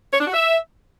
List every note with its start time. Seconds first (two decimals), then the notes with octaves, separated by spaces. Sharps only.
0.13 C#5
0.20 D4
0.27 F#4
0.34 E5